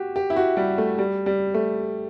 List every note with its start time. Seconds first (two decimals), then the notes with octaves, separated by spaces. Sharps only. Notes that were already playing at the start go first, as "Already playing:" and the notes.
Already playing: F#4 G4
0.16 G4
0.30 E4
0.36 F#4
0.57 G3
0.78 A3
0.99 G3
1.26 G3
1.54 A3